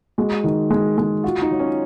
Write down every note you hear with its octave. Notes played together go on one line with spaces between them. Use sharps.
G#3 F#4
D#3
G#3
G#3
F4 F#4
D#4
F#3
C#4